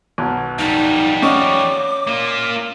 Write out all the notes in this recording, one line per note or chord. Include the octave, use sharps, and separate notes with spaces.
B1 F#3
F2 G3 D#4
C#4 D#5 F#5 D6
A#3 F4